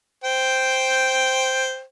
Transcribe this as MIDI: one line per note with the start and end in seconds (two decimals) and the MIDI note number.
0.24 1.82 72
0.24 1.82 79